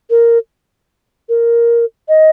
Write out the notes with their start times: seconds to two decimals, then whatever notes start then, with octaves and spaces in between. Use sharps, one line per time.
0.10 A#4
1.29 A#4
2.09 D#5